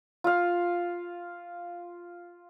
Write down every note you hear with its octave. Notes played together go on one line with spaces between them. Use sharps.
F4 F5